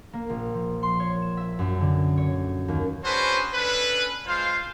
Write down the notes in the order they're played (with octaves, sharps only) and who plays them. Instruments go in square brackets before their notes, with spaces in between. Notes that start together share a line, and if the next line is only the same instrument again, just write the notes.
[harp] A#3
A#1
F3
C6
C#5
E7
E5
F#2
D3
C#5
D#2
[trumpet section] C#4 D4 F#4 G#4 B4 C5
C#4 D4 A4 B4
G#3 F4 C5 F5